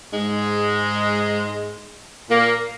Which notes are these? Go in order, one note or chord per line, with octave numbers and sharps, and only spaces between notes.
G#2 G#3
A#2 A#3